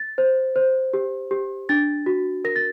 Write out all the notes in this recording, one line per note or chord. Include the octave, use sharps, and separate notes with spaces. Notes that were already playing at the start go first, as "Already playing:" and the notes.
Already playing: A6
C5
C5
G4
G4
D4 A6
F#4
A#4 A#6
A6